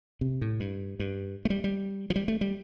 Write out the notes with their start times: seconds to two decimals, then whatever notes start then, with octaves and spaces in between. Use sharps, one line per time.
0.21 C3
0.41 A2
0.60 G2
1.00 G2
1.45 A3
1.50 G3
1.64 G3
2.10 F3
2.16 G3
2.28 A3
2.41 G3